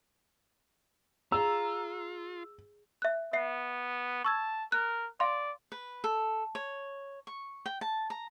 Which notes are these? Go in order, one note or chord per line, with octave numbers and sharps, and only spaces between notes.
F4 G#4 A#5 E6
E5 F#6
B3 E5 C7
A5 C#6 E6 G#6
A#4 F#6
D5 F5 C6
B4
A4
C#5
C#6
G5
A5
A#5